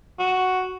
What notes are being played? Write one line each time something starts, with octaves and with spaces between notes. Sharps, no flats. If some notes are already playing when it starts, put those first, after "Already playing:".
F#4